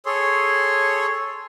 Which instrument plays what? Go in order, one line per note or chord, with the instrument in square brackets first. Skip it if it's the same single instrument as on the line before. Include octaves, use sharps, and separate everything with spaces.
[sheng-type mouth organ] G#4 A4 C#5 C6